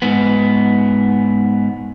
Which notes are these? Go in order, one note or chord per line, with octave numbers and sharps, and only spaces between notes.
G#2 B3